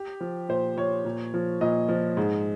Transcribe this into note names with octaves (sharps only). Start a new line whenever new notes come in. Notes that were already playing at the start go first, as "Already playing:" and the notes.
Already playing: G4
F3
A#2 C5
F3 C#5
A#2
F3
A#2 D#5
F3
G#2